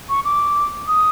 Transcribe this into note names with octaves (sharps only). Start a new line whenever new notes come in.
C#6
D6
D#6